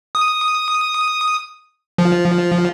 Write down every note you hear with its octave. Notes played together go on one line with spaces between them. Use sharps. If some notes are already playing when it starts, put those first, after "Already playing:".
D#6
F3